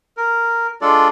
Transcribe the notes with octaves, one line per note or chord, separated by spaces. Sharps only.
A#4
G#3 D4 F4 A4 D5